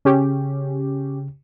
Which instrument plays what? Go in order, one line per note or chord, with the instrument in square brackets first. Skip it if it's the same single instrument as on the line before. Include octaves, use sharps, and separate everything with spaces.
[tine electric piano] C#3 [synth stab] C#4 G4